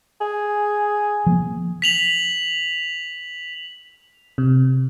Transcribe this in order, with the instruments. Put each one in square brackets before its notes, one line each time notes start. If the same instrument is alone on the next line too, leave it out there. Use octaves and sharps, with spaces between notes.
[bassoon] G#4
[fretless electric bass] F3 A#3 B3
[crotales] B6 F7 F#7
[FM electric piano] C3